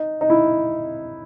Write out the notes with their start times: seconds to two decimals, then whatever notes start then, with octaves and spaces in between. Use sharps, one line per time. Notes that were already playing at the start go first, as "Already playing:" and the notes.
Already playing: D#4
0.21 D#4
0.30 E4